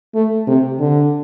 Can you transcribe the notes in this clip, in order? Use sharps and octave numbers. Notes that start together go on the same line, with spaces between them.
A3
C3
D3